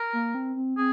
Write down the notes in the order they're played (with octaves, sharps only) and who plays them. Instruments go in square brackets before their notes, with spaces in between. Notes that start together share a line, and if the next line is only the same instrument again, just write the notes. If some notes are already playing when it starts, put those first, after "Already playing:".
Already playing: [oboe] A#4
[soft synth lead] A#3
C4
C4
[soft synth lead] C4 [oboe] G#4